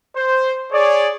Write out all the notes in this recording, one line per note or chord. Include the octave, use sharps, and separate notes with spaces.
C5
G#4 C#5 D5